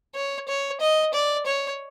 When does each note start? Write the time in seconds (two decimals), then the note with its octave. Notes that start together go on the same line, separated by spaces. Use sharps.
0.15 C#5
0.48 C#5
0.81 D#5
1.14 D5
1.46 C#5